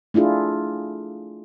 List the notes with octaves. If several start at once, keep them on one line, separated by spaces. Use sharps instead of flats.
A3 D4 E4 F4 G#4